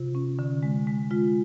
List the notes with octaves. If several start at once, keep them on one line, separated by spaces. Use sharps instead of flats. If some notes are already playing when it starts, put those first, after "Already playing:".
Already playing: C3 F4
C#4
D3
G#3
G#3
G#3 F4